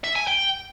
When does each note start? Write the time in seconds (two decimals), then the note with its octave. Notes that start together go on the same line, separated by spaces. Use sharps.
0.04 E5
0.16 G#5
0.27 G5